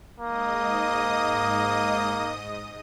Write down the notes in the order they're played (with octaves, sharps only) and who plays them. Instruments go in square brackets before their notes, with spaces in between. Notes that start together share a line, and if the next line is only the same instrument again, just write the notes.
[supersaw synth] G#2 D#5 D#6 [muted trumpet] A#3